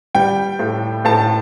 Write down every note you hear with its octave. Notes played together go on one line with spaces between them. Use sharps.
G3 G5
A2
A2 A5